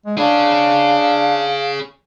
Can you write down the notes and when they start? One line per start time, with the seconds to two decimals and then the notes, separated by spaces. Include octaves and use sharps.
0.06 G#3
0.18 D4 G#4 C#5 F5